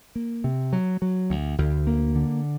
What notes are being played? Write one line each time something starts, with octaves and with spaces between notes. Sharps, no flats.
A#3
C3
F#3
F#3
D2
D2
A#3
D3